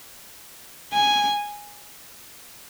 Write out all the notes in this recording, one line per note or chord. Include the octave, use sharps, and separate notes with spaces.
G#5